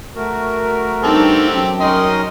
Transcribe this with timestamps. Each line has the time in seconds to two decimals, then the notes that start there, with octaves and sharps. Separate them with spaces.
0.16 A3 F#4 A#4
1.04 G2 C4 D#4 G4 A4
1.52 F#2 G5
1.81 C#4 D#4 A#4 D#5 C6